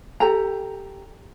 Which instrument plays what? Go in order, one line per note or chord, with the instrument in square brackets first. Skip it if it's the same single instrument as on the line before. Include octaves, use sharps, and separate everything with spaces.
[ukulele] G4 A4 G5 A#5